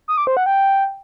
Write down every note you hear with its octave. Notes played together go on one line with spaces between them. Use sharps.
D#6
D6
C5
F#5
G5